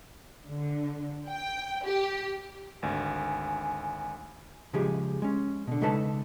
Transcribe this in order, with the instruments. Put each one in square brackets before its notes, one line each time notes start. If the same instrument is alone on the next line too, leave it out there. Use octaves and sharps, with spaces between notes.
[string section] D3
G5
G4
[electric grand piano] G#1 D2 [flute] G#5
[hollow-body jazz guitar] C#3 F3 G#3 G4 G#4
G#3 C#4
B2 D3
C#3 G#3 D#4 A4 B4 A5